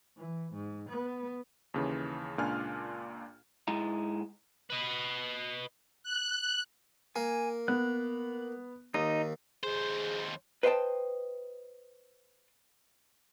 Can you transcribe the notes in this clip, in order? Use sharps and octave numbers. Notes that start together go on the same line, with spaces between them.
E3
G#2
B3
D#2 C#3 E3
C#2 A#2 D4 F4 G#5 F6
G#2 G#3 E4 D#5 A#5
B4 D#5
F#6
A#3 G#5
B3 F#6
D#2 D#4 D#5
D#2 G#4 C5
B4 C5 D#5 E5 G5 A5